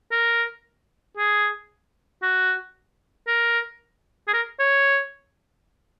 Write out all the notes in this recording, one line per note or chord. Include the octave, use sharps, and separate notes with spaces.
A#4
G#4
F#4
A#4
G#4
A#4
C#5